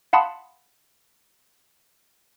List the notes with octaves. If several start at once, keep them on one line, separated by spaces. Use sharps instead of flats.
F5 F#5 A5 B5 C6 D#6